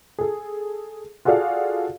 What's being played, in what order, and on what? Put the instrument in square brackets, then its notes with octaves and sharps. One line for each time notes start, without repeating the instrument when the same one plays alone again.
[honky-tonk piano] G#4 A4
F4 F#4 G#4 A4 D5 F5